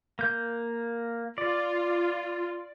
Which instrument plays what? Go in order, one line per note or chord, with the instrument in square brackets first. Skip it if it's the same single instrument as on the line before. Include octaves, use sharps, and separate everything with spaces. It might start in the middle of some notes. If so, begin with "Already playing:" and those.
[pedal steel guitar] A#3 G6
[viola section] F4 [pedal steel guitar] D5